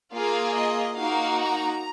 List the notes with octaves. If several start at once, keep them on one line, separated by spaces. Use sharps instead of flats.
A#3 F4 G#4 F5
D#5
A#3 D#4 F#4 F5
A#5